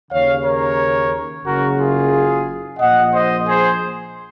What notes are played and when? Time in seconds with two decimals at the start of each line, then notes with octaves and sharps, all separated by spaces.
0.10 D#2 C#3 C#5 F5
0.44 A#4 C#5
1.44 F#1 F#2 C#3 F#4 A#4
1.78 F4 G#4
2.78 A#1 A#2 D#5 F#5
3.12 C5 D#5
3.46 G#4 C5